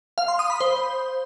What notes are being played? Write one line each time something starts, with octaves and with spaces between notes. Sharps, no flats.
F5
C6
D#6
B5
C5